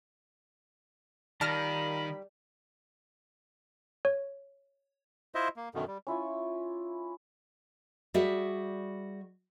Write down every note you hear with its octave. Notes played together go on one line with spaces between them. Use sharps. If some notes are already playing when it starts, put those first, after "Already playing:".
D#3 G3 F4 A#4 A5 B5 F6 A#6
C#5
E4 F4 C5 D#5 E5
A#3
F#2 B2 D3 D#3
G3
C#4 E4 F4 C#6
G3 F#4 G#4 D5 E5